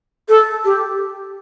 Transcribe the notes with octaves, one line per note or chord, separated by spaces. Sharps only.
A4
G4